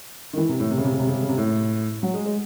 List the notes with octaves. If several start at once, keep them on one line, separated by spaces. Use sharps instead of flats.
D#3
E3
C3
A2
C3
C#3
C3
C#3
C3
C#3
C3
C#3
C3
A2
F#3
G#3
G#3